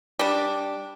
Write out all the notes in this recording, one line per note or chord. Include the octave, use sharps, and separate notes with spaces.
G3 D4